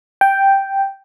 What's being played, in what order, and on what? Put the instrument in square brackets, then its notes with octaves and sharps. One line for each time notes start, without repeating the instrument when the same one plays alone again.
[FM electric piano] G5